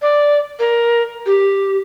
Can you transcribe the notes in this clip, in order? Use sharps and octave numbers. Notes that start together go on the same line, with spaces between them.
D5
A#4
G4